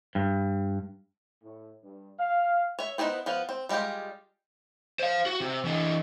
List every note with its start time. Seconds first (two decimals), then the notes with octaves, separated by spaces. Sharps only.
0.15 G2
1.43 A2
1.84 G2
2.19 F5
2.79 C#5 E5
2.98 B3 D#4 E4 G#4 C5
3.26 F3 B3 F5
3.49 C4
3.69 G3 G#3 F4 G4 G#4
4.99 C5 F5
5.26 F#4
5.40 C3
5.65 E3 D4